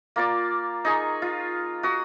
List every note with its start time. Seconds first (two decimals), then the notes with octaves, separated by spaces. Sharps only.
0.16 A#3 F4 D5
0.85 D#4 G#4 C#6
1.22 F4
1.83 F#4 D#6